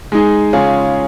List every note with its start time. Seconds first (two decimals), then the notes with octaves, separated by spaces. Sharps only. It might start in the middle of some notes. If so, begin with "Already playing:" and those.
0.12 G#3 D#4 G#4
0.53 C#3 G#3 C#4 F4 G#4